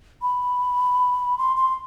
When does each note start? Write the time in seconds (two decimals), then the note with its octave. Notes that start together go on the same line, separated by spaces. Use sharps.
0.22 B5
1.38 C6
1.57 C6